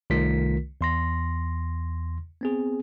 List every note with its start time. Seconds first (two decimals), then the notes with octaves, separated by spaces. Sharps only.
0.10 C2 D#3 A3 F4 A#4 B6
0.81 E2 C6 A#6
2.41 B3 C4 G#4